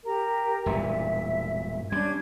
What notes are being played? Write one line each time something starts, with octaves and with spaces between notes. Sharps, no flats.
G4 A#4 A#5
E1 G2 A#2 E5
G3 C#4 D4 G#6